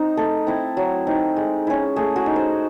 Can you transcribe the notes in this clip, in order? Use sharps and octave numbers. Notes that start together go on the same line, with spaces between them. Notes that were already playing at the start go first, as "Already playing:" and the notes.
Already playing: C4 D#4 C5 D#5
A3 A4
C4 E4
F#3
C4 D#4
G#3
C#4 E4
A3 G#4
F#4
D#4
C5